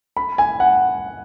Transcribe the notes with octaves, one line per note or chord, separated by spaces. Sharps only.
B5
G#5
F#5